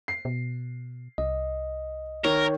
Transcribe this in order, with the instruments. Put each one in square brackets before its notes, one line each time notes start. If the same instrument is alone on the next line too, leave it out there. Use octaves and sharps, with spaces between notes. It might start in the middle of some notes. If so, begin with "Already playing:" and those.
[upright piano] C7
[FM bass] B2
[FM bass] C2 [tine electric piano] D#5
[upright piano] D#3 [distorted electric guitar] A#4 [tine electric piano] C#5